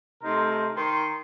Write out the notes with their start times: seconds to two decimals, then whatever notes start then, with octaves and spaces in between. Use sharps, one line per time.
0.23 C3 A3 D#4 A#4 C6
0.76 D#3 A#4 C6